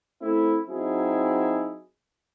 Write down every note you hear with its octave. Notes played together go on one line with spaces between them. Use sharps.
A3 C4 E4
F#3 C4 D#4 E4 G#4